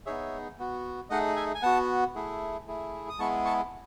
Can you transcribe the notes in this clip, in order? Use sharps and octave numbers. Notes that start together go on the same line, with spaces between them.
B3 D#4 G#4 C#5 E5
B3 F#4
A3 D#4 G#4 D#5 F#5
E5 G#5
G#5
B3 F#4 F#5 A5
A3 E4 G#4
A3 E4 G#4
D#6
G#3 B3 E4 G#4 A5 C#6
A5 C#6